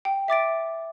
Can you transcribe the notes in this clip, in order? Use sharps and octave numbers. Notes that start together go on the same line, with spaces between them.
G5
E5 D6 A6 D7